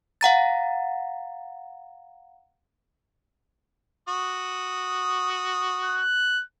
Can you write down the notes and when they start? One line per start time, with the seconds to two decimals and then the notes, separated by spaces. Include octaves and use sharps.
0.21 F5 F#5 A#5 A6
4.08 F#4 D#6
5.83 F#6